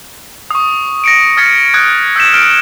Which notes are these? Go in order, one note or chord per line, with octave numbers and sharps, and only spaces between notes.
C#6 D#6
A#6 C#7 D7
D#6 F6 G#6 A6 B6 C#7
D#6 F#6 G#6
E6 G6 B6 E7
F6 D7